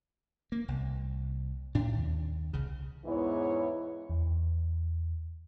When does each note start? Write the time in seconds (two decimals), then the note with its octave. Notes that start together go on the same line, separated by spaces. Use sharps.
0.52 A#3
0.68 C2
1.75 A2 D4
1.93 D#2
2.53 C2 C#3
3.05 E2 G#2 E3 B3 E4 C#5
4.10 E2